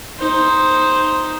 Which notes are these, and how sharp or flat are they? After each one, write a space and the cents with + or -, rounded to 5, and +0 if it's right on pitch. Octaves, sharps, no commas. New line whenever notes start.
D#4 +5 C5 +0